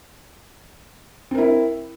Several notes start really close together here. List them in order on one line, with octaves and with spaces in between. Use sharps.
C4 A#4 E4